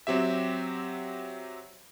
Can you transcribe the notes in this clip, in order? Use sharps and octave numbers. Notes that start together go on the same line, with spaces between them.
F#3 C4 G4 E5